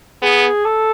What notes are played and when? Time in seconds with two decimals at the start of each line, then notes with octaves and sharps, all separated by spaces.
0.22 B3 G#4
0.65 A4